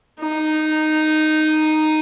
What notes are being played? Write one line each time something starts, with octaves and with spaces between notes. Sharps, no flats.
D#4